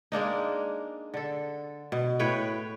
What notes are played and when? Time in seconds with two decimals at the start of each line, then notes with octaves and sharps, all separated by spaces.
0.12 G#3 A#3 D4 D#4
1.14 D3 A4
1.92 B2
2.19 A2 B4 C#5 G5